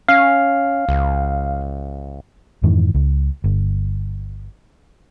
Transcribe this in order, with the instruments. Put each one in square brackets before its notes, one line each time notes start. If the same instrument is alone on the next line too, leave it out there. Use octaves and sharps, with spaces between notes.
[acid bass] C#4 [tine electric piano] F5
[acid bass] C#2
[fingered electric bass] F2 G#2 D#3 E3
C#2
G1